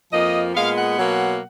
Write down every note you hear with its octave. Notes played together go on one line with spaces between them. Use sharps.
F2 F3 A#3 D#5
A#2 G#3 B3 F5
F#5
B2 F#3 A#3